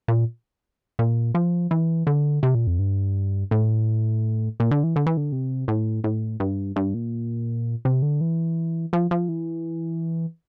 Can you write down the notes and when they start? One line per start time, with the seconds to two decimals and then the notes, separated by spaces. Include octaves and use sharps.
0.08 A#2
0.99 A#2
1.35 F3
1.71 E3
2.07 D3
2.43 C3
2.55 A#2
2.67 F2
2.79 G2
3.51 A2
4.60 A#2
4.71 D3
4.84 E3
4.96 D3
5.06 E3
5.17 D3
5.32 C3
5.68 A2
6.04 A2
6.40 G2
6.76 G2
6.94 A#2
7.85 C3
8.02 D3
8.21 E3
8.93 F3
9.11 F3
9.29 E3